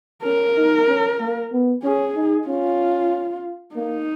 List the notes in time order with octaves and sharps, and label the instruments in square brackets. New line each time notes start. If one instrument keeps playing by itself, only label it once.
[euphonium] C#4 [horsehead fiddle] A#4
[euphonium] D#4
C#4
A#3
B3
[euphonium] C#4 [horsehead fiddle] G#4
[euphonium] D#4
[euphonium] C#4 [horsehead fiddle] F4
[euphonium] A#3 [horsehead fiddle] D#4